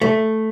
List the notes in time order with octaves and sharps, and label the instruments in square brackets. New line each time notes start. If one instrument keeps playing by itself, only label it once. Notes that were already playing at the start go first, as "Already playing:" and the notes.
[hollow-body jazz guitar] A3